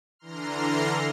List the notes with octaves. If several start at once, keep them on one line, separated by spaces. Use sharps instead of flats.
D3 E3 A#5 C6 F6